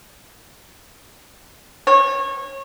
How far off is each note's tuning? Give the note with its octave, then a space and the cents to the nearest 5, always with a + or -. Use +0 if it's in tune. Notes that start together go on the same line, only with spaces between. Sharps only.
C#5 -25